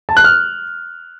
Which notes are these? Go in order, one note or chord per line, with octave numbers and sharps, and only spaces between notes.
A5
F#6
F6